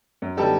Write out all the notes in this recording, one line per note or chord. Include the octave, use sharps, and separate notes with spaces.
F#2
D3 G3 B3 D#4 G4 A4